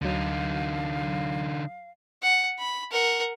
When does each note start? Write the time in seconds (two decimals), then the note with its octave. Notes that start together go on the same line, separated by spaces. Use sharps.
0.01 D2 D3 F#3 D#4 F5
2.22 F#5
2.59 B5
2.91 A#4 F#5